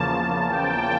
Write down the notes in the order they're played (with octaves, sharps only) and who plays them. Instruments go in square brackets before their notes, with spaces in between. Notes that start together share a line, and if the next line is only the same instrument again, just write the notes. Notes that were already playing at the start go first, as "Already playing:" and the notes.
Already playing: [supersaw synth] E2 C#3 F3 A#3 A5
G5